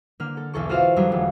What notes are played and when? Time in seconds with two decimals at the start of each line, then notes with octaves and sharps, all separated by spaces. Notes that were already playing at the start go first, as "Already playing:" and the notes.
0.20 D3 A#3 F6
0.37 A4
0.54 B1 E2 A4 C#6
0.69 F4 F#4 A4 C5 C#5 F5
0.96 F2 D3 F#3 G3 D4
1.12 E1